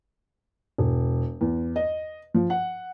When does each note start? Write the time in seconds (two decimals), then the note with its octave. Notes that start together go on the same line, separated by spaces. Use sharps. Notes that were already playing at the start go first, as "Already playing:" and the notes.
0.78 E1
1.41 E2
1.76 D#5
2.34 F3
2.50 F#5